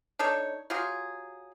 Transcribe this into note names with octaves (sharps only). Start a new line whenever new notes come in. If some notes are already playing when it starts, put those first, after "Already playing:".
D4 D#4 A4 C#5
F#3 F4 G4 G#4